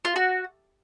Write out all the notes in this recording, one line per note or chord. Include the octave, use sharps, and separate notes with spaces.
F4
F#4